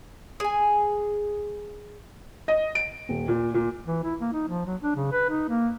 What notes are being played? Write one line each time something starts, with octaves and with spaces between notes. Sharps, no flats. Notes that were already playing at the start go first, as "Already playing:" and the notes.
G#4 G#5
D#5
D7
D#1
A#2
A#2
E3
E4
A#3
D#4
F3
F#3
D4
C#3
B4
D#4
A#3